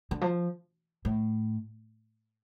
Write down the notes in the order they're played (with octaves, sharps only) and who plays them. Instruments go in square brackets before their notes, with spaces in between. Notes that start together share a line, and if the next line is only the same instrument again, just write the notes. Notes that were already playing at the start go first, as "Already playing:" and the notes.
[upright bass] D3
F3
A2